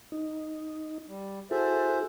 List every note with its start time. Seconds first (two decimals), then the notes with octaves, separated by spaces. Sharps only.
0.12 D#4
1.08 G3
1.51 E4 F#4 G#4 A4 C5 E5